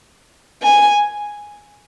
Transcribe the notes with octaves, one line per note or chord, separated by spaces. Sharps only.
G#5